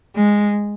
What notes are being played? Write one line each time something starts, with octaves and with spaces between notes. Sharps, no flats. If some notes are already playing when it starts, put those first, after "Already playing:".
G#3